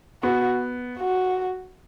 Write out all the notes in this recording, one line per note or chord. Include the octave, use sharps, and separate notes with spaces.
B3 F#4
F#4